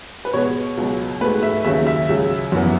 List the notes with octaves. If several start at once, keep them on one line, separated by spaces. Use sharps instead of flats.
B4
B2 G#3 B3 C#5
C#2 B2 F#3
G#2 F#3 A3 B4
E5
D#2 C#3 F#3 C#4 E5
E5
C#2 C#3 F#3
F#2 E3 B3